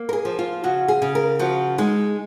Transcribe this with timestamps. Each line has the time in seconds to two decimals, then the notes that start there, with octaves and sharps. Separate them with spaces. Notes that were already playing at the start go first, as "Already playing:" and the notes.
Already playing: A#3
0.09 A#4
0.13 G#4
0.25 F3
0.39 F4
0.64 C#3 F#4
0.88 G#4
1.02 C#3
1.15 A#4
1.39 F3 F#4
1.78 G#3 D#4